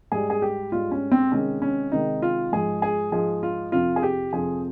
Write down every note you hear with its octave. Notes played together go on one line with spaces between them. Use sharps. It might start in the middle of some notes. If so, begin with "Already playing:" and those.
G#2 G3 G#4
G#4
G4
G#2 G3 F4
C#4
C4
C3 D#3 G#3 C#4
C#4
C3 D#3 G#3 D#4
F4
G#2 F3 G#3 G#4
G#4
G#2 F3 G#3 G#4
F4
F2 C3 F3 F4
G#4
G4
F2 C3 F3 G#4